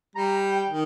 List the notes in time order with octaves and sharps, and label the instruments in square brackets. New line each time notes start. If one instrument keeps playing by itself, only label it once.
[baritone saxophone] G3 [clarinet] A#5
[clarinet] G5
[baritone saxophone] D#3